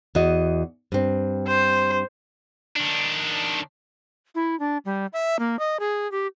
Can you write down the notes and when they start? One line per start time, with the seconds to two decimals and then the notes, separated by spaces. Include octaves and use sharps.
0.15 E2 F#4 D#5
0.92 G2 C4
1.47 C5
2.76 D#3 D4
4.35 E4
4.60 D4
4.85 G3
5.13 E5
5.39 A#3
5.59 D#5
5.80 G#4
6.12 G4